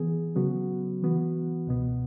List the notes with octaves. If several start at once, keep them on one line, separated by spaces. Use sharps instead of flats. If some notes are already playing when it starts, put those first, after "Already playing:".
Already playing: E3 B3 G#4
C#3 F#3 B3 F#4
E3 B3 F#4
C#2 B2 B3